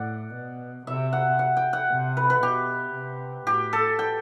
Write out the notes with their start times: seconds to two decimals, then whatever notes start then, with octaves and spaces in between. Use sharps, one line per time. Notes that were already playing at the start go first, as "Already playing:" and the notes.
Already playing: A2 D5 F#5
0.35 B2
0.87 C3 E5
1.13 F#5
1.39 F#5
1.57 G5
1.73 F#5
1.91 C3
2.17 B4
2.30 B4
2.43 B2 G4
2.94 C3
3.47 A2 G4
3.73 A4
3.99 G5